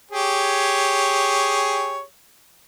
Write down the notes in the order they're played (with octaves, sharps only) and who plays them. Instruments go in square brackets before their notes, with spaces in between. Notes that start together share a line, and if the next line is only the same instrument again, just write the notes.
[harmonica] G4 G#4 C#5